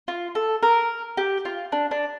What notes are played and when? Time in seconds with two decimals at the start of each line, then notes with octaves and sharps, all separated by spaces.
0.08 F4
0.35 A4
0.63 A#4
1.17 G4
1.45 F4
1.72 D4
1.91 D4